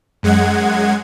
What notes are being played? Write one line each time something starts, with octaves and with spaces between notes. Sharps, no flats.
F#2 G#3 F#5 G#6